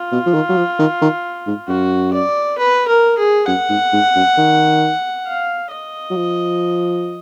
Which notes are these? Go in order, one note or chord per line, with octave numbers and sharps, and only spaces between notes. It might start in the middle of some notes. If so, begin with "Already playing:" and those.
Already playing: F4
B2
F3
D#3
F#3
F3
D#3
D#3
G#2
F#2 F#4
D5
B4
A#4
G#4
F#2 F#5
G#2
G#2
F#2
D#3
F5
D#5
F#3
F3